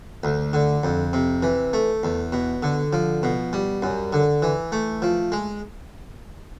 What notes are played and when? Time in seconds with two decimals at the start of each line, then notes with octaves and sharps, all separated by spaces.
0.24 D2
0.53 D3
0.83 F2
1.13 C3
1.43 E3
1.73 A3
2.03 E2
2.33 B2
2.63 D3
2.93 F3
3.23 B2
3.53 G3
3.82 F#2
4.13 D3
4.42 E3
4.72 A3
5.02 F3
5.32 G#3